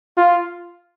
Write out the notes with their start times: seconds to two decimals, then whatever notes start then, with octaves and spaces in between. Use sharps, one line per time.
0.18 F4